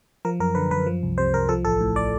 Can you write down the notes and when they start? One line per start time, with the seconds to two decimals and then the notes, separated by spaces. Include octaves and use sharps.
0.25 F3 A#4
0.40 F#2 A#4
0.55 D3 B4
0.71 F#2 B4
0.86 F3
1.03 C2
1.18 C3 C5
1.34 C2 A#4
1.49 F3 A4
1.65 A1 A4
1.81 A2
1.96 D5